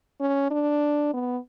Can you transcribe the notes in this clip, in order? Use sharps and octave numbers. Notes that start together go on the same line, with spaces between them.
C#4
D4
B3